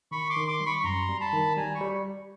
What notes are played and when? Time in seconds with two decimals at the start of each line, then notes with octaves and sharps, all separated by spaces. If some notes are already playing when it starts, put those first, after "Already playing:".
0.11 D#3 B5 C#6
0.30 C6 D6
0.36 D#3
0.48 C6 D6
0.60 G3
0.66 B5 C#6
0.80 C#6
0.84 F#2 A#5 C6
1.09 G3
1.20 A5 B5
1.33 D#3
1.57 G3 G#5 A#5
1.75 B5 C#6
1.81 G3